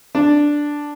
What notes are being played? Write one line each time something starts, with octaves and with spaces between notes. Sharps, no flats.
D4